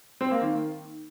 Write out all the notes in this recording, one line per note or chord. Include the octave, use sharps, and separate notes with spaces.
C4
A#3
D#3